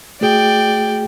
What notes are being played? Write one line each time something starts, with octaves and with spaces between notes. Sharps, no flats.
A3 F#4 G#4 D5 G5